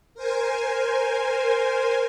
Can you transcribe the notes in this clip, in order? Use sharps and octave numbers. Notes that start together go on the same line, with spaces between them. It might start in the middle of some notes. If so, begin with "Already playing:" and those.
A#4 C5 G#5